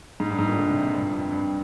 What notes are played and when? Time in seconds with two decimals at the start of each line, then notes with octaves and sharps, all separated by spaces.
0.20 G#2
0.30 G2
0.39 G#2
0.48 A#2
0.58 D3
0.70 C3
0.82 C3
0.94 G2
1.12 F2
1.31 G2